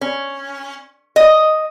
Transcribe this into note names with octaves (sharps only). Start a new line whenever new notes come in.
C#4
D#5